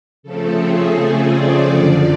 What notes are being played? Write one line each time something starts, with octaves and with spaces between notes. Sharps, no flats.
C#3 F3 A3 C4 A4
G#4
G#4
D5
F#2 D3 F3